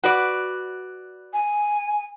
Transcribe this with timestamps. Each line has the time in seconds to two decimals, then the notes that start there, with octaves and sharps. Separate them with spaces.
0.04 F#4 B4 D5
1.33 G#5